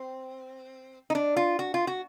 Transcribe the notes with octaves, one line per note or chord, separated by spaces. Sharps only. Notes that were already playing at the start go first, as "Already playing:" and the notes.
Already playing: C4
D#4
D4
F4
F#4
F4
F#4